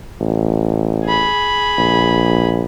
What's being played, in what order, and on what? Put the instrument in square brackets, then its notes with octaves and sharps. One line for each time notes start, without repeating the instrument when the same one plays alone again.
[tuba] A1
[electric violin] G#4 B5
[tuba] A#1